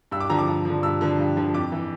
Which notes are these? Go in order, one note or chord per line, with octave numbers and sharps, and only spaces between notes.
G2 E6
D6
D3 F3 A#5
D6
G2
D3 F3
G2 E6
D3 F3
G2
D3 F3
F2 D6
E3